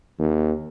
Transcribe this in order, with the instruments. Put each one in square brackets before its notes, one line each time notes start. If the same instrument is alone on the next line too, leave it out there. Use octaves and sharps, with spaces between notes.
[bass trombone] D#2